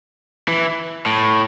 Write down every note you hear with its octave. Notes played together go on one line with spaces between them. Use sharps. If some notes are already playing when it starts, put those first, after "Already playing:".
E3
A2